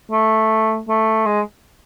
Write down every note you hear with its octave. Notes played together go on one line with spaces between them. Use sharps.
A3
A3
G#3